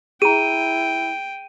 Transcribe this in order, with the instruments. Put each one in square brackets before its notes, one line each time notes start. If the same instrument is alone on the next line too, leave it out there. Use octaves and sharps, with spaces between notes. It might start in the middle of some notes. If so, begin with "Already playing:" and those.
[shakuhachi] E4 [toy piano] G#4 A#5 [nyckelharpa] G5 [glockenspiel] D#7